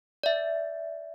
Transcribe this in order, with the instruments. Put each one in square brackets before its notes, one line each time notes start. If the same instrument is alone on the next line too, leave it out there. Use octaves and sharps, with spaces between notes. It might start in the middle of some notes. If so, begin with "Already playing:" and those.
[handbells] D5 E5